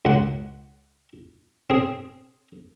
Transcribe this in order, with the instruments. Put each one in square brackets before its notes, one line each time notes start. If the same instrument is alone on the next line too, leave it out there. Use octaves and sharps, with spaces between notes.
[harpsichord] C#2 F#5
C4 G#4